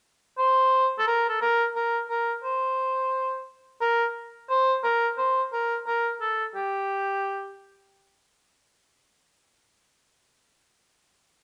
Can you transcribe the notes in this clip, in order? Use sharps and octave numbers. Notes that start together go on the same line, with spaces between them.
C5
A4
A#4
A4
A#4
A#4
A#4
C5
A#4
C5
A#4
C5
A#4
A#4
A4
G4